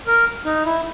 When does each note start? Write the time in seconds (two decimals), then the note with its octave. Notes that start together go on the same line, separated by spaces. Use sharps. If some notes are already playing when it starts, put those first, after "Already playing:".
0.07 A#4
0.45 D#4
0.65 E4